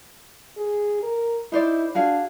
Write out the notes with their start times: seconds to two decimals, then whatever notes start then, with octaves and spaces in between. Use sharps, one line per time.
0.57 G#4
1.03 A#4
1.52 D#4 E4 C5 D5
1.95 D4 F#4 G#4 F5